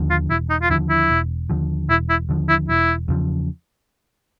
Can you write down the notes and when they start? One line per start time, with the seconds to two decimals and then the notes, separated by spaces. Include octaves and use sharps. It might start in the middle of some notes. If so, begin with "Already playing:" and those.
Already playing: D#2 D3 F3
0.10 F4
0.30 E1 E4
0.50 D#4
0.62 F4
0.70 D#2 D3 F3 E4
0.90 E4
1.10 E1
1.50 D#2 D3 F3
1.89 E1 E4
2.10 E4
2.29 D#2 D3 F3
2.49 E4
2.69 E1 E4
3.08 E2 C#3 F3